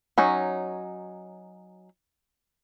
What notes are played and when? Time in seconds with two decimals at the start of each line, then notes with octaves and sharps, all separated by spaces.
0.18 F#3 C#4 D#4